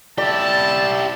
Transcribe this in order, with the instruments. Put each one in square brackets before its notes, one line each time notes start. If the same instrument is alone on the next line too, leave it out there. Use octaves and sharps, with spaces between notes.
[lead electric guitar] E4 G4 [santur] D5 [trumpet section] A5